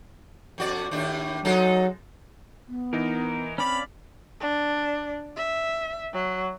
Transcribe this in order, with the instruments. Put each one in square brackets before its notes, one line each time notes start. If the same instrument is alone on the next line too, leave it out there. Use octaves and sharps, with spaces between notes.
[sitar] F2 F#4 D5
D#2 A2 D4
[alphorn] F#3 [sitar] G#3 D#4 A4
[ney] B3
[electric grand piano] E3 D#4 [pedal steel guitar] A#4
[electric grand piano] C4 [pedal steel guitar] C#4 D5 F5 [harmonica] B5
[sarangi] D4
E5
F#3